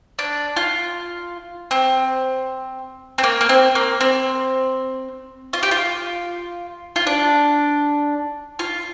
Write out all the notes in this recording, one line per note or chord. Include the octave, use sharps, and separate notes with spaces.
D4
F4
C4
C4
A#3
A#3
C4
A#3
C4
F4
G4
F4
F4
D4
F4